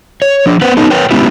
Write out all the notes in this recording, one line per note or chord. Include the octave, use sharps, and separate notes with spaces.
C#5
F3 D4
B3 B4 C5 F#5
B3 C#4 D#4 A4
A#4 B4 C#5 G5
G#3 B3 C#4 E4 G4